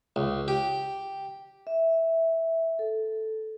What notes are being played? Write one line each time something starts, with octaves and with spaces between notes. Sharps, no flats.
C#2
G4
E5
A4